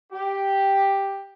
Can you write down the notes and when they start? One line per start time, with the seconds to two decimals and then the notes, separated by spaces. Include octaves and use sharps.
0.12 G4